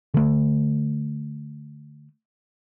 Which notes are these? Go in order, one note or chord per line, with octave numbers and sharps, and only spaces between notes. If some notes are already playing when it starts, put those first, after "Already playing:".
D3 A3